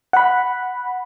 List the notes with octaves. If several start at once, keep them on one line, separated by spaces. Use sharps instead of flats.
F#5 B5